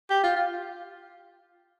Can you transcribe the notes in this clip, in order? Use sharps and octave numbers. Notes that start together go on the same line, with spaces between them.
G4
F4
F4